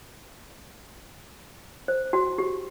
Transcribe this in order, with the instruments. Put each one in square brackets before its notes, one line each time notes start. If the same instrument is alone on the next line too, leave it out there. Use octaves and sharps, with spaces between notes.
[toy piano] C5
F#4
G4